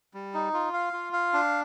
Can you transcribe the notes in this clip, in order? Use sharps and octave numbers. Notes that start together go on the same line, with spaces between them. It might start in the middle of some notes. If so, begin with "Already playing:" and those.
G3
D#4
F4
F5
F4
F5
D4